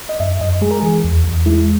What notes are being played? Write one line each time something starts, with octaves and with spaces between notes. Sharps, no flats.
D#5
F#2 E5
F#2 D#5
G#3 G#4
A#4
E3 G#4
E2
E2
G#3 E4